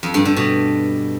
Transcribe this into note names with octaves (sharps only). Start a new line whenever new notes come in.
F2
G2
D3
B2